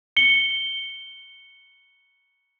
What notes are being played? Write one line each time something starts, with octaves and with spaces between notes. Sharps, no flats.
C#7 G7